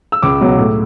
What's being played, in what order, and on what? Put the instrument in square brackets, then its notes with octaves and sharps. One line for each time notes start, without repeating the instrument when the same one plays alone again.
[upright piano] E6
C#2 D6
B2 F#3
A2